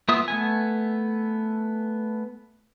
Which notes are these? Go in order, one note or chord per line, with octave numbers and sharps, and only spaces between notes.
A#3 B3 F4 E5 D#6
A3 B3 G#5